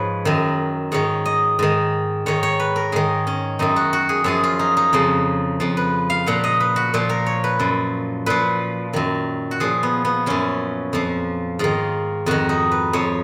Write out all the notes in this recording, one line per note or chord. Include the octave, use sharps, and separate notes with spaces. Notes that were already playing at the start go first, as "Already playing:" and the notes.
Already playing: G#2 F3 B4 C#5
F#2 D#3
G#2 D#3 C#5
D#5
G#2 D#3
G#2 D#3 C#5
C#5
B4
A#4
G#2 D#3 G#4
C#4
F#2 D#3 D#4
F#4
F#4
G#4
F#2 F3 G#4
F4
D#4
D#4
F2 C#3 F3
F2 F3
B4
F5
A#2 F3 F#5
D#5
B4
F#4
A#2 F3
A#4
C#5
B4
F#2 F3
A#2 F3 B4
F#2 D#3
F#4
A#2 F3 G#4
B3
B3
F#2 F3 C#4
F2 F3
G#2 D#3 F4
F2 D#3 F#4
D#4
B4
F2 F3 C#5